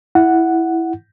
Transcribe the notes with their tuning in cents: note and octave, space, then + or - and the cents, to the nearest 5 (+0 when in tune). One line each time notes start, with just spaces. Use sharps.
E4 +0 F#5 +0